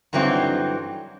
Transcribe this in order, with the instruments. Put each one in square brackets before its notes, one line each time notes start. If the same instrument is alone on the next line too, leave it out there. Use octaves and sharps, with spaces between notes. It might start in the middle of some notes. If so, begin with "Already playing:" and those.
[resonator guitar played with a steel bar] G2 D3 E3 F#3 C4 D#4